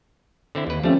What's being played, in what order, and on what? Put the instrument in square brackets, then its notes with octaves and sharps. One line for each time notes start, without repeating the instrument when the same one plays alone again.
[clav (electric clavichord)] D3 C4 E4
D#2 B4
[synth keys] F3 C4 C#4 [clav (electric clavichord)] G3 A3